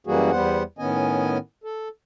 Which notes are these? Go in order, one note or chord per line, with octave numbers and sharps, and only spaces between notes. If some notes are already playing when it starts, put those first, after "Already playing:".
F#2 E3 G3 A#3 F#4 G#4
E2 G3 B3 C5 F#5
A2 D#3 B3 C#4 D#5 G#5
A4